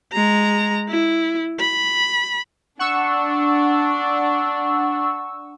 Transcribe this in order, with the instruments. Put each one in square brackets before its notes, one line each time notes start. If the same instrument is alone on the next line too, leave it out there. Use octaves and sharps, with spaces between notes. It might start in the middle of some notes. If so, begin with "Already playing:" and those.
[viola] G#3 A#5
E4
B5
[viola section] D4 [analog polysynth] F#5 C#6 E6